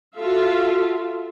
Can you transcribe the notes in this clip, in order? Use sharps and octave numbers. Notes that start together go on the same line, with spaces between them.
F4 F#4 A4 E5 F5